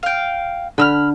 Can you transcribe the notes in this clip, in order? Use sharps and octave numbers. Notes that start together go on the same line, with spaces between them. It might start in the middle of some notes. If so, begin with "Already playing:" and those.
F5 G5
D3 B5 E6 F6